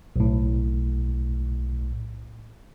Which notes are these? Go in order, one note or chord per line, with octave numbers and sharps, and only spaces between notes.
B1 A2